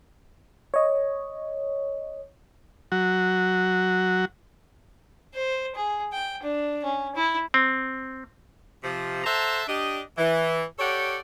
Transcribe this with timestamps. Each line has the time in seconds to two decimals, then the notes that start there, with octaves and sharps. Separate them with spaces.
0.74 C#5 D#5
2.92 F#3 F#4
5.34 C5
5.75 G#4
6.13 G5
6.42 D4
6.84 C#4
7.15 E4
7.54 C4
8.83 C3 F3
9.24 A4 C5 E5 F#5 A5 A#5
9.68 D4 G4 D#5
10.18 E3
10.79 G4 A4 C#5 D5 F#5 G5